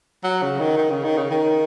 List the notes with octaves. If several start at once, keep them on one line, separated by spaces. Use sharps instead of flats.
F#3
C#3
D#3
D#3
C#3
D#3
C#3
D#3